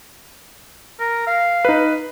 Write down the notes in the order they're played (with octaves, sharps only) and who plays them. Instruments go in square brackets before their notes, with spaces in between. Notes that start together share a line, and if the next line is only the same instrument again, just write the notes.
[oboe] A#4
F5
[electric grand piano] D#4 B4